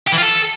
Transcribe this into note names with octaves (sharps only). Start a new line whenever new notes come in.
G4
E3
F4
A4